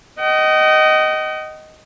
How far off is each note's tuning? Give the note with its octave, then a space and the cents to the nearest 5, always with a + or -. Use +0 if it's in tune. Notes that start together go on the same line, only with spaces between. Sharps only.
D#5 +0 G5 -45